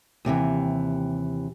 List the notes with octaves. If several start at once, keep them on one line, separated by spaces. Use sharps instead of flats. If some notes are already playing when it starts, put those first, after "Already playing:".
D#2 C3 D#3 E3